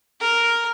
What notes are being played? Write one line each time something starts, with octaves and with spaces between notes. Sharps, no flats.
A#4